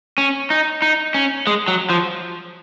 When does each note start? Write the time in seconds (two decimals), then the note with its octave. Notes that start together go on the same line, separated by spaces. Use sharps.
0.18 C#4
0.50 D#4
0.82 D#4
1.14 C#4
1.47 G#3
1.68 F#3
1.90 F3